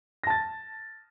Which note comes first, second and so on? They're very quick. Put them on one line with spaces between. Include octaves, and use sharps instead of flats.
A#6 A5 A6